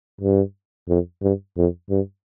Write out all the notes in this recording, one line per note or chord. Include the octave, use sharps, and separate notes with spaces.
G2
F2
G2
F2
G2